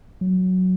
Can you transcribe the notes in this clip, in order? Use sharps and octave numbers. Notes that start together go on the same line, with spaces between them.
F#3